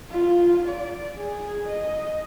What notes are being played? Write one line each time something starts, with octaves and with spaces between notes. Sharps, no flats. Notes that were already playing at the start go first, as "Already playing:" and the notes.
F4
D5
G#4
D#5